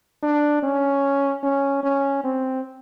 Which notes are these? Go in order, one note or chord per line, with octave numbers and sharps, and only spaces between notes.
D4
C#4
C#4
C#4
C4